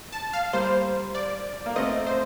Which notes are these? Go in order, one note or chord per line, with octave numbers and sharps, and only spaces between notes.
A5
F5
G3 A#3 C5
D5
A#3
A3 C4 D#5
C5